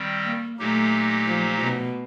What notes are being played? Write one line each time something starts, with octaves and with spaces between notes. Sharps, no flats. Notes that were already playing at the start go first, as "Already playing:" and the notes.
Already playing: D#3 G3 C4
A#3
A#2 F#3 A3 A#3 D#4 G4
F3
B2